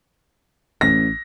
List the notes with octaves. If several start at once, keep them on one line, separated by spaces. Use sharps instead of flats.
A1 A#6